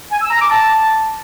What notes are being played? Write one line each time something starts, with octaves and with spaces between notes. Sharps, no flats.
G#5
E6
A#5
D6
A5